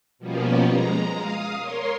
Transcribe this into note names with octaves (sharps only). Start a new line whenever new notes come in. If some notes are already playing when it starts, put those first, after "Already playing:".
B2 F3 G3 A#3 B3 C#4
G#3 A#5
F5 D#6
A#4 C#5 C6